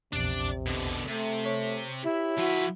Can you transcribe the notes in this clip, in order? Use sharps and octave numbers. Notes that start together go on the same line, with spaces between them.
A#1 E2 C3 D4 D5
B2 D3
C3 A3
C#5 B6
E4 G4
F3 F#4 B4